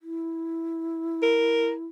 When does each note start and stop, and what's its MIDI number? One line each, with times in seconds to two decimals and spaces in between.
0.01 1.85 64
1.23 1.72 70